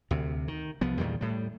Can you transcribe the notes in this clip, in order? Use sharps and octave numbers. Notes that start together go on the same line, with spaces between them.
D2 C3
D#3
C2 F3 B3
E2 A#2 D#3 G3
A2 G3